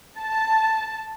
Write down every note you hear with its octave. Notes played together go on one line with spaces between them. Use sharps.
A5